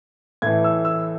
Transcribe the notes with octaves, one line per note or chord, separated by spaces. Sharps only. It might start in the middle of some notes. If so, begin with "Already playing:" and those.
A2 E3 G#6
E6
E6